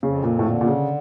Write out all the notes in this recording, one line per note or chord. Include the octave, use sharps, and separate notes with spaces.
F2 C#3
A#2
A2
A#2 D3
A#2
C#3